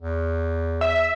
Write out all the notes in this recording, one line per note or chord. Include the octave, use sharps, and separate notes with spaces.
E2
E5